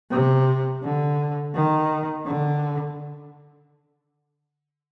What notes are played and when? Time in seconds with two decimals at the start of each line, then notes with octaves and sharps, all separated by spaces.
0.11 C3
0.82 D3
1.54 D#3
2.26 D3